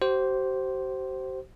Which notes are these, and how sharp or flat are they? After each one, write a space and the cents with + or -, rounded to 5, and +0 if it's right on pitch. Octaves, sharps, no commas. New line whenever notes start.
G4 -45 C5 +0